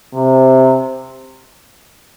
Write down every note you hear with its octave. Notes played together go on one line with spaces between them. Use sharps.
C3